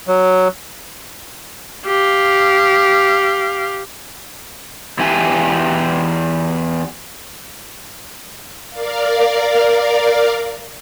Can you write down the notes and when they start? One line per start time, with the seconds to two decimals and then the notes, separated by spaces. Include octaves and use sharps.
0.08 F#3
1.85 G4 F5
4.99 E2 E4 G4 G#5
8.70 A#4 D5 F5